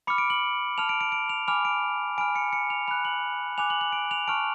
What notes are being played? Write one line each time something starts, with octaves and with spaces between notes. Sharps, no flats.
B5 D6 F6 C#7
D7
F#7
A5 F6 F7
D7
D7
D7
F7
G#5 B5 D6 F6 F7
D7
G#5 B5 F6 D7
C#7
C#7
F7
B5 F#6 F7
F#7
G#5 D6 F#6 F7
F#7
F#7
D7
F7
A5 C#6 F6 D7